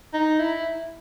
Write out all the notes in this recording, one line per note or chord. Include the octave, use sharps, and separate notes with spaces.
D#4
E4